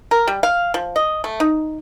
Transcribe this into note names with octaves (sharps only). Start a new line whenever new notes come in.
A#4
G3
F5
F3
D#5
A3
D#4